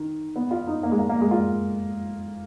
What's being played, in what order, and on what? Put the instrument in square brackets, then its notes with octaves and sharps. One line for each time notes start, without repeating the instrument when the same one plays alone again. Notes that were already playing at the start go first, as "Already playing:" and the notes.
Already playing: [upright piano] D#3
B3
F4
D#4
A#3
G#3
A#3
A#3
G#3
F4